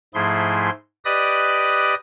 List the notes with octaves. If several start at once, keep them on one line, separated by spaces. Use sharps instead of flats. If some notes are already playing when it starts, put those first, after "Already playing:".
G#2 F3 A3 E4 G#4 C6
G4 B4 D5 D#5 D#6 F#6